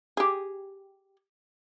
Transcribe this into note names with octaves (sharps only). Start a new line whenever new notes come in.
G4 G#4